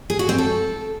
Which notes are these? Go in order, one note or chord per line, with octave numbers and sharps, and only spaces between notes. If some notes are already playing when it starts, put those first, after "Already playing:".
G#4
F#4
C4
A4